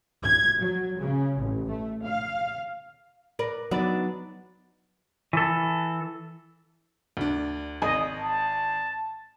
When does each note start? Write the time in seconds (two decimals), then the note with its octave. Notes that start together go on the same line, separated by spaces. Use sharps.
0.24 G#6
0.61 F#3
0.99 C#3
1.40 A1
1.70 A3
2.03 F5
3.39 A#4 B4 D5
3.71 F#3 B3 D4 D#4 B4 D5 A6
5.33 E3 A4
7.17 D2 D4
7.82 G#1 D#5 G#5
8.18 A5